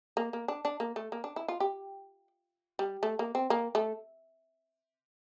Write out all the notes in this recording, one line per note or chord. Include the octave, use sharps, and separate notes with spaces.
A#3
A#3
D4
D4
A#3
A3
A#3
D4
E4
F4
G4
G3
A3
A#3
C4
A#3
A3